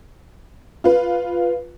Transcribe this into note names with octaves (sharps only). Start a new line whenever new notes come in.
F4 B4